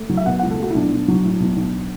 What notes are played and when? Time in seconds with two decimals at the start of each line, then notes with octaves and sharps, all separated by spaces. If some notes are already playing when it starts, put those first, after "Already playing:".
Already playing: A3
0.09 F#3
0.17 E5
0.26 B2 F#5
0.39 C#2 F#5
0.51 A4
0.59 A3 F#4
0.70 E4
0.74 B1 D4
0.92 B1
1.08 F#3
1.25 A2
1.40 B1
1.56 B1